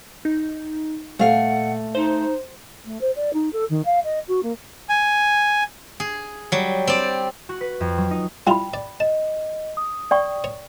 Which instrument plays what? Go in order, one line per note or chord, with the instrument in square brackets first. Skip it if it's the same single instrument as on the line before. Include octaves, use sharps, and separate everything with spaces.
[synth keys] D#4
[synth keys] A#2 [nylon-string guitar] A3 F5 [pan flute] F#5
[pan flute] D#4 [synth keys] C5
[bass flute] A3
C5
D5
D#4
A4
D#3
F5
D#5
F#4
A#3
[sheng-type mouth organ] G#5
[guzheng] G#4
F#3 G3
C4 D5
[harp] F#4
B4
F2
F#3
D#4
[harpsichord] G3 E4 F4 [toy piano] G5 B5
[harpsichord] D5
[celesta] D#5 [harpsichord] A5
[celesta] D#6
[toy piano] D5 G5 C#6
[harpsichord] C#5